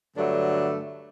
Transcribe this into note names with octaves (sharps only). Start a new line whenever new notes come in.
G2 D3 F#3 A3 D4